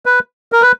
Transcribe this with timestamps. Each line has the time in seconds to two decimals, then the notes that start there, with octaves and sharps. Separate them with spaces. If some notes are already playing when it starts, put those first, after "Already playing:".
0.06 B4
0.52 A#4
0.62 B4